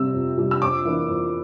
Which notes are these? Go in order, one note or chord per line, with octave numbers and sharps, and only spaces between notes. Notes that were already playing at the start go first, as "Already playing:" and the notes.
Already playing: C3 G3 C4 E6
F2
C3 G3 C4
E6
F2 D6
E3 A#3 D4
F2